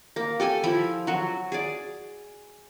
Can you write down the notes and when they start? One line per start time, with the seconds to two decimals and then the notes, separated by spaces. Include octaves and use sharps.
0.16 A#3
0.40 G4 A4 G#5
0.64 F3 E4 E5 B5
1.07 F#3 F#4
1.52 G#4 D5